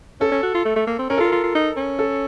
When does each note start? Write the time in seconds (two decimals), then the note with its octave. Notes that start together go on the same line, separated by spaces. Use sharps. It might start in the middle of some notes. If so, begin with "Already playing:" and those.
0.20 C#4 A4
0.32 C#4
0.43 F#4
0.54 F4
0.65 A3
0.76 A3
0.87 A#3
0.99 C4
1.09 C#4 A#4
1.18 F4 A4
1.25 A#4
1.32 F4
1.44 F4
1.55 D#4
1.77 C#4
1.99 A4